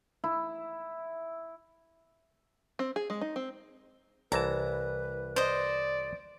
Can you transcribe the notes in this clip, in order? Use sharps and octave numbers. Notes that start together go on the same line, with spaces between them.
E4
C4
G#4
G#3
D#4
C4
C2 E3 B4 A5 A#5
C5 D5 D#5